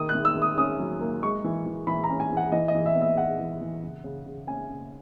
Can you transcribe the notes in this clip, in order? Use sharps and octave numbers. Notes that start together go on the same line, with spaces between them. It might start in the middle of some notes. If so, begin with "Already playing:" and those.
Already playing: D#3 D#6
F#6
D#3
E6
D#3
D#6
C#4 D#6
F#3
A#3
G#3 C#6
E3
E3
E3 B5
A#5
C#4
G#5
E3
F#5
E3 D#5
D#5
E3
E5
B3
E5
B3 F#5
E3
E3
C#3
C#3
C#3
C#4 G#5
C#3